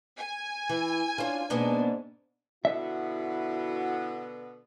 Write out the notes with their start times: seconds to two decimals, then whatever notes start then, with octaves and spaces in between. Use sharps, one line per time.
0.17 G#5
0.69 E3
1.18 C#4 D4 F4 C5
1.50 G#2 B2 A#3 B3 D4
2.65 B2 D3 B3 E4 F#4 E5